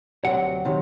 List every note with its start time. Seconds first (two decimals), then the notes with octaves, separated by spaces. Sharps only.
0.25 D2 C3 F#3 F#5
0.65 C3 D#3 F#3